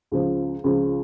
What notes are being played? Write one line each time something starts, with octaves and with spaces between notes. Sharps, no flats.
C#2 C#3 F3
C#2 C#3 F3